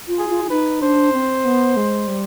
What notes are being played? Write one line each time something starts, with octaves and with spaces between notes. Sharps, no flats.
F4
G#4
F4
F4
D#4 B4
D4 C5
C4
B3
G#3
G3